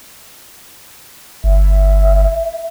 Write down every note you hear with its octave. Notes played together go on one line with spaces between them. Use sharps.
G1 E5